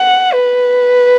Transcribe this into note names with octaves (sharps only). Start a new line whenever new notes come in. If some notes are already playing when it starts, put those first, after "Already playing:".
Already playing: F#5
B4